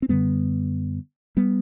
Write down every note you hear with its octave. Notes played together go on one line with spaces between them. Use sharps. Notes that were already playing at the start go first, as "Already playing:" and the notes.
C4
F#2 D3 G3 B3
G3 B3